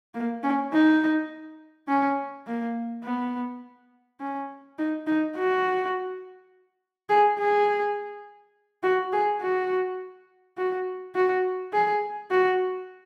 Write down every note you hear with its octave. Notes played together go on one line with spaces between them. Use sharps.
A#3
C#4
D#4
C#4
A#3
B3
C#4
D#4
D#4
F#4
G#4
G#4
F#4
G#4
F#4
F#4
F#4
G#4
F#4